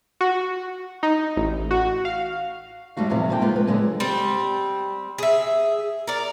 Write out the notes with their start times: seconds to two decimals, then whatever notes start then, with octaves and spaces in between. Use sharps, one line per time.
0.21 F#4
1.03 D#4
1.37 A1
1.71 F#4
2.05 F5
2.97 F#2 D#3 G3 A3 F#4 F5
3.10 E2 A2 C3 F3
3.29 D2 G#2 A#3 D4 G5
3.41 G#3 A#3 B3 F4
3.56 B4
3.67 D3 F#3 G#3 G#4
4.00 G3 C4
5.18 G#4 E5
6.07 A#4 D5